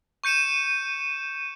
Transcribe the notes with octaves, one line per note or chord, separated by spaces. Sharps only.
C#6 G6 C#7 D#7 E7